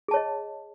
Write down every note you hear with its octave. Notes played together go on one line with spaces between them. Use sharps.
G#4 C#5 D#5 A5